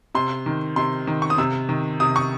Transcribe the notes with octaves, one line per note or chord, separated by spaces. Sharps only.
C3 C6
D#3
C3 C6
D#3
C#6
D#6
C3 E6
D#3
C3 D#6
C#6